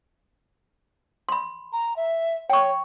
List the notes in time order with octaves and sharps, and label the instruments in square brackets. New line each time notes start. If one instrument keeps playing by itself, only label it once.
[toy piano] B5 C6
[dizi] A#5
E5
[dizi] C#5 [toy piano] G5 C#6